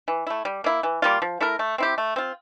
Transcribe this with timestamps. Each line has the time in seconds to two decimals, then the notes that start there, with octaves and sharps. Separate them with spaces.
0.08 E3
0.27 A3 E4
0.45 G3
0.64 A#3 E4
0.83 E3
1.02 G3 A#3 F4
1.22 F3
1.41 A3 E4 A#4
1.59 A3
1.78 C4 E4 G4
1.98 A3
2.16 C4 F4